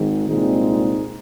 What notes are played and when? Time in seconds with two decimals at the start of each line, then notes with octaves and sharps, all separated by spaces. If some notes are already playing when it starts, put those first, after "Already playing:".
Already playing: G#1 G#2 D#3
0.28 C2 A#2 G#3 C4 D#4